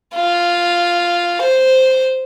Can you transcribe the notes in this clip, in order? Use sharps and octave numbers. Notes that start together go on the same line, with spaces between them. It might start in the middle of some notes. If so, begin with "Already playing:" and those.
F4
C5